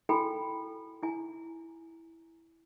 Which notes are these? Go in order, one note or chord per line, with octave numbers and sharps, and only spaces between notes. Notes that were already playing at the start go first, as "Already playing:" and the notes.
E4 F#4 A4 G5 G#5 B5
E4 G#5